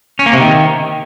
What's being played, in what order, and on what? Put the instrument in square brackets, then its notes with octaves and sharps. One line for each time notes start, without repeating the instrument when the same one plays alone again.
[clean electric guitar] C#4
A#3
C3
D#3